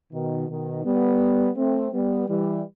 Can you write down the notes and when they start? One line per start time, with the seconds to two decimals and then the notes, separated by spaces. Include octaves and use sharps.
0.12 B2 D#3
0.48 B2 D#3
0.84 G3 B3
1.56 A3 C4
1.92 G3 B3
2.28 E3 G3